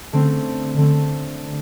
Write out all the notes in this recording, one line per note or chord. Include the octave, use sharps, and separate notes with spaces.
D3 A3 C4
D3 A3 C4